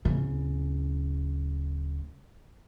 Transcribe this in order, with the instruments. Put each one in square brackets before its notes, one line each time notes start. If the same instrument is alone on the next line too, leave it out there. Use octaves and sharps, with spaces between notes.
[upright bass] D1 C#3